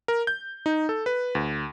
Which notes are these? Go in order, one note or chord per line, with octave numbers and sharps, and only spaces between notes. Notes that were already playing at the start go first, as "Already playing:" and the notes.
A#4
G6
D#4
A4
B4
D2